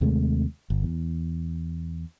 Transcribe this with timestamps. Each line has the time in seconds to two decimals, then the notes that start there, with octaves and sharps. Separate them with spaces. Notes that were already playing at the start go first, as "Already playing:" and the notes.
0.01 D#2 C3 G#3 A3
0.70 G1
0.83 E2